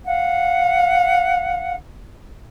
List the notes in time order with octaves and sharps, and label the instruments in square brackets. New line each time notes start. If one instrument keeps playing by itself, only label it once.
[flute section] F5 F#5